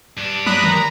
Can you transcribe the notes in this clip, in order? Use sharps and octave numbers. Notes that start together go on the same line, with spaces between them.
G2 D4
F#3 A#5 B5 D#6 F#6
D#3 A#5